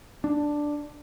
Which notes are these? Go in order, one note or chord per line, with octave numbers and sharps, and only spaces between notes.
D4